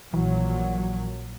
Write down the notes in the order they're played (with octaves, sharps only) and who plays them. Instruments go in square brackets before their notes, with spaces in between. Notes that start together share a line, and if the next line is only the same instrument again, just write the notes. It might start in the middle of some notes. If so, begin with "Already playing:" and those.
[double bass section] A#1 A#2 F#3 [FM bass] E3